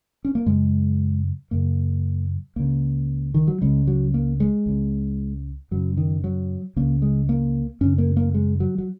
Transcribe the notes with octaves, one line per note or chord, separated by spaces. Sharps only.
C#4
A#3
F#2 C#3 G#3
F#2 C#3 A#3
C#2 C#3 A#3
D#3
F#3
C#2 C#3 G#3
F#3
A#3
G#3
C#2 C#3
F#2 C#3 F#3
D#3
F#3
C#2 C#3 A#3
G#3
A#3
F#2 C#3 C#4
A#3
A#3
G#3
F#3
F#3